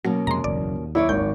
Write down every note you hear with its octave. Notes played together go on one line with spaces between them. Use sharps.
B2 F#3 A#3 C#4
F2 C3 G#3 A#5 C6
F#1 B1 E2 D5
D#2
F#2 E4 C#5 D5
G#1 G6